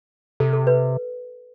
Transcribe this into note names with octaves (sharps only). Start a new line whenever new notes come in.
C3 A4
A4
B4